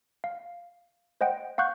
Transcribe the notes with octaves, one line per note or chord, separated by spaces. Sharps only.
F5
C5 D#5 F#5 G5
F5 F#5 C#6 F#6 G6